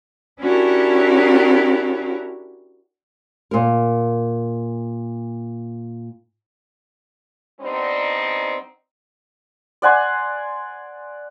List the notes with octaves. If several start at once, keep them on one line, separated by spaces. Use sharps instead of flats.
C#4 D4 E4 F#4 G4 A#4
A#2 A#4
G3 B3 C4 D4 D#4
D5 F#5 G#5 C6